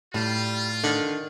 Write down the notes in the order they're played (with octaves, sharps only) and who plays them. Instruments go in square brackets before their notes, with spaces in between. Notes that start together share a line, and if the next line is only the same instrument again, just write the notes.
[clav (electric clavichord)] A2 [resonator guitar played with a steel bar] G3 [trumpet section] F4
[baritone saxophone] D3 [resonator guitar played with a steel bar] D#3